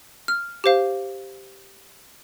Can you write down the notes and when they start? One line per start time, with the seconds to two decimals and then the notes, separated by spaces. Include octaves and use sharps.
0.28 F6
0.64 G4 C5 F5